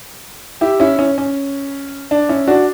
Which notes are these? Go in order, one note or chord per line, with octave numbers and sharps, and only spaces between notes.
E4 G4
C#4 E4
C#4
C#4
D4
C#4 E4
D4 F#4